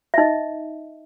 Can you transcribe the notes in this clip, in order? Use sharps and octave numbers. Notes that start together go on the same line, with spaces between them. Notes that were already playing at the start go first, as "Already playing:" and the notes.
E5
D#4 D#5